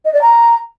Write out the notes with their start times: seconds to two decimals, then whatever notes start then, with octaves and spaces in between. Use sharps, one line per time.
0.05 D#5
0.13 D5
0.21 A#5